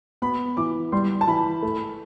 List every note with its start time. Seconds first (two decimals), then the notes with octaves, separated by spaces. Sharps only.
0.22 B3 B5
0.57 E3 D6
0.92 G3 C6
1.21 A5
1.27 E3 B5
1.63 A3